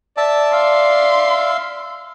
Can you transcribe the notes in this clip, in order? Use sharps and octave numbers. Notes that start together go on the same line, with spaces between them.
D5 E5 A5
E5 F5 C6